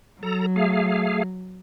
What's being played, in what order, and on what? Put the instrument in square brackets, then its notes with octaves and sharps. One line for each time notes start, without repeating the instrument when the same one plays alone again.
[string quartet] F#3 [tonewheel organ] A4 A#5
[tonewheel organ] A3 G#4 F5